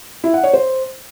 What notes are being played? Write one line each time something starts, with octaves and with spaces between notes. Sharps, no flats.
E4
F#5
C#5
C5